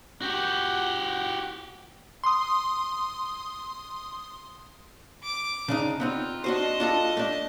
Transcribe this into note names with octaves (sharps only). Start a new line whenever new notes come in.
F#4 G4
C6 D#6
D6
C#3 D4 D#4
B3 C4 D#4 F4
D4 F#4 C5 D#5 A5
D4 F4 A4
A3 D4